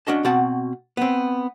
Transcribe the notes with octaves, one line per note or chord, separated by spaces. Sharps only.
C#4 D4 F#4 D#5 A5
B2 C4 F#4 F#5 A5
B3 C4